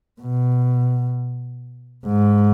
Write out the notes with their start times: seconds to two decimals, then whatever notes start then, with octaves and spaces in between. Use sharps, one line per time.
0.21 B2
2.06 G#2